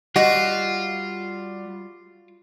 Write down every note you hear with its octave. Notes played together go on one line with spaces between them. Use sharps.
G3 F4 F#4 D#5 F#5